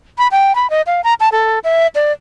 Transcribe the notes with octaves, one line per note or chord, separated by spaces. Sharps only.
B5
G5
B5
D#5
F5
A#5
A5
A4
E5
D5